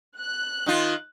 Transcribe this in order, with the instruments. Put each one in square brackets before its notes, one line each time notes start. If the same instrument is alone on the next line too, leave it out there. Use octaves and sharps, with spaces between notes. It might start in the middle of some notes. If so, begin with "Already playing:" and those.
[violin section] F#6
[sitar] D#3 D#4 F4